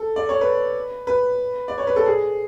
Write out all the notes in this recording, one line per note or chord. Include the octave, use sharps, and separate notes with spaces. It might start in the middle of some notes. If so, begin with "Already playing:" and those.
Already playing: A4
D5
C#5
B4
B4
D5
C#5
B4
A4
G#4